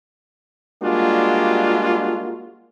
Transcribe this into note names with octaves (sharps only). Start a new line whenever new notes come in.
G3 G#3 A#3 D4 F4 F#4